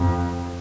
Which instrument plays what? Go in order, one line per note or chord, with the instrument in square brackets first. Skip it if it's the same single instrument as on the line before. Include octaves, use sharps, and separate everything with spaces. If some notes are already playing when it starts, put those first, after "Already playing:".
Already playing: [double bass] F2